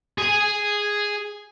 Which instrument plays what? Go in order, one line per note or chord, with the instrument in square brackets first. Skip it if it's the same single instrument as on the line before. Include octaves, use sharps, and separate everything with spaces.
[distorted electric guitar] G#4 G#5